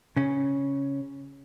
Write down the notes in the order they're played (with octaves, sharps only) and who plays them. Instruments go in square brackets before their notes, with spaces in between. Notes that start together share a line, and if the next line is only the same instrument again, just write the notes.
[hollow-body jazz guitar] C#3 C#4